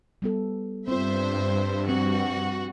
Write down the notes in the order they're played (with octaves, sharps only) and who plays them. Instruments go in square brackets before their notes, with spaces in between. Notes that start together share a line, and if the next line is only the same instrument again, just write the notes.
[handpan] G3 B3 A4
[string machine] G2 [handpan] C4 F4 [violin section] C5 E5
[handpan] F3 C4 [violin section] F#4